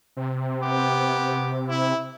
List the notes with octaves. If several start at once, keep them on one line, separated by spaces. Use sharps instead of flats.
C3
B3 G4
E4